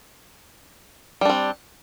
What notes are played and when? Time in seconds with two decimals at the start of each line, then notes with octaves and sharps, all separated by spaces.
1.21 G3
1.25 D4
1.30 C4